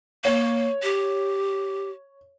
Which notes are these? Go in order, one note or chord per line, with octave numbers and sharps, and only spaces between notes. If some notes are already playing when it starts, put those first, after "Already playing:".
A#3 C#5
G4